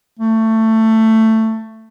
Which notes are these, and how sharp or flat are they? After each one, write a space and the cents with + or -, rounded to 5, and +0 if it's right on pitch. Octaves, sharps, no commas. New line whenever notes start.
A3 +15